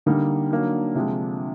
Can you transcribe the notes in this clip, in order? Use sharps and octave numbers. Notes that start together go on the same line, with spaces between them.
D3 G3 A#3 D#4
F#3 A#3 D#4
C3 F3 G#3